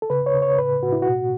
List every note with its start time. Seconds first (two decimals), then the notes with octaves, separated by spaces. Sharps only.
0.02 A4
0.10 C#3 B4
0.26 C#5
0.34 C#3
0.42 C#5
0.58 A2 B4
0.82 A2 F#4
0.92 E4
1.02 B2 F#4